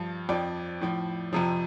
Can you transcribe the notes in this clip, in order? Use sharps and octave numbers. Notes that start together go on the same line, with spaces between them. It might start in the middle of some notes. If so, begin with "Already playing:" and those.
Already playing: G2 F3 A5
F2 F3 D5 G5
A2 F3
F2 C3 F3